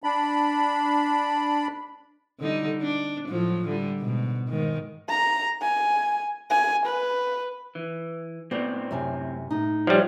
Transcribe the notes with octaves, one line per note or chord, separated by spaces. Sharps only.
D4 B5
D3 G3 D#4
D4
A2 F3 F#3
D3 G3
G#2 B2
G#2 D#3
A#5
G#5
G#5
B4
E3
A2 B3 C4 D5
F#2 C3 G#5
A2 D#4
F3 G3 C#5 E5 F#5